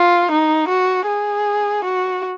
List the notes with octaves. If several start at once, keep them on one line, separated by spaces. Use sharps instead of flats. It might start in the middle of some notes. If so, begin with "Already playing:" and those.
Already playing: F4
D#4
F#4
G#4
F#4